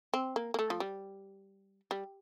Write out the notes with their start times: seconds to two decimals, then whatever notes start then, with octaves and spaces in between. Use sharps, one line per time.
0.14 C4
0.36 A#3
0.54 A#3
0.59 A3
0.70 F3
0.80 G3
1.91 G3